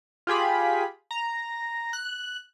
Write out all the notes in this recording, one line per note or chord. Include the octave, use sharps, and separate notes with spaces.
F4 G4 G#4 B5
A#5
F#6